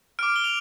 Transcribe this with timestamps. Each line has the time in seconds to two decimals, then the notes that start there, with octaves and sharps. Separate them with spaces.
0.19 D6 F6 D7
0.36 G7
0.44 F7